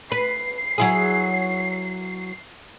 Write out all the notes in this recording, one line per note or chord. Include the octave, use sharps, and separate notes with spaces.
B4 C7
F#3 E4 G#4